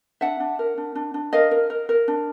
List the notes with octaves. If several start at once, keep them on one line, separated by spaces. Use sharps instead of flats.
D4 E5 F#5
D4
A#4
D4
D4
D4
A#4 D#5 F5
A#4
A#4
A#4
D4